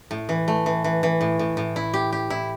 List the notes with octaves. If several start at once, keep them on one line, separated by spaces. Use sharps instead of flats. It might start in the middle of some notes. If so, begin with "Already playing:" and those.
A2
E3
A3
E3
E3
E3
A2
A2
A2
E4
G4
G4
E4